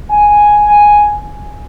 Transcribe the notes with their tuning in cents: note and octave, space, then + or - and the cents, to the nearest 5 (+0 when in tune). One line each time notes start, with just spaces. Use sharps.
G#5 +0